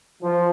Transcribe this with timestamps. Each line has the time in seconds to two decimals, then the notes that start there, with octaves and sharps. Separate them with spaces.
0.23 F3